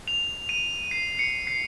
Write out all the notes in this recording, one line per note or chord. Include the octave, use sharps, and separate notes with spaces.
F7
D#7
C7
C#7
C7